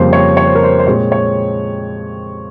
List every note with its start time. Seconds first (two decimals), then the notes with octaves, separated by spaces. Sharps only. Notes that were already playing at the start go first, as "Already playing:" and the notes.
Already playing: F2 C#3 G3 A#3 C5
0.13 C#5
0.37 C#5
0.46 C5
0.55 A#4
0.63 C5
0.79 C5
0.87 A#2 G#3 C4 C#5
1.12 C#5